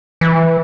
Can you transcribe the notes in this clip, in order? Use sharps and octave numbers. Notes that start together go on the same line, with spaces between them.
E3